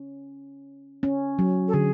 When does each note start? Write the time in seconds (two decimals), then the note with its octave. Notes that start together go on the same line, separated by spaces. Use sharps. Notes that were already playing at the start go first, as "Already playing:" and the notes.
Already playing: C#4
1.03 C#4
1.39 F#3
1.68 A4
1.73 D3 G#4